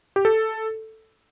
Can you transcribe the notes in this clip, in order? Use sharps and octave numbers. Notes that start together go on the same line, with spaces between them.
G4
A4